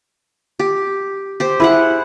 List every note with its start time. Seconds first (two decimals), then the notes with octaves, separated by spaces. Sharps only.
0.59 G4
1.40 G4 C5
1.60 E4 G#4 C5 F#5